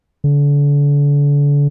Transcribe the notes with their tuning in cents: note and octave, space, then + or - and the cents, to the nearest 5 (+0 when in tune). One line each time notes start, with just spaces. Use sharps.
D3 -35